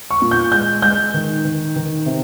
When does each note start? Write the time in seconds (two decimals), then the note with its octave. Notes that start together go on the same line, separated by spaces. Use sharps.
0.11 C#6
0.22 A#2
0.31 G6
0.52 G#3 G6
0.82 G#3 G6
1.14 D#3
1.45 D#3
1.76 D#3
2.06 C3